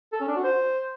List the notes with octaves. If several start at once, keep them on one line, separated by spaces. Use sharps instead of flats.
A4
C#4
D4
F#4
C5